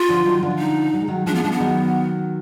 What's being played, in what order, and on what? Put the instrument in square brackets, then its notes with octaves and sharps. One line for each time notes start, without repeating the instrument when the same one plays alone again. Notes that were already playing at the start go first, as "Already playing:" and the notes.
Already playing: [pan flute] F4
[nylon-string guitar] D3 F3
D#3 F#3
D3 F3
[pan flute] D#4
[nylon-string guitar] F#3
G#3
D#3 F#3
[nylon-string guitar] F3 G#3 [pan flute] D4
[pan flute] B3
[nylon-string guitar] F3 G#3 [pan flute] D4
[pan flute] B3
[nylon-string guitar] D#3 F#3